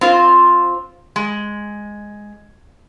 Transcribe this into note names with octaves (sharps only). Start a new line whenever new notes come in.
C4 F4 C5
G#3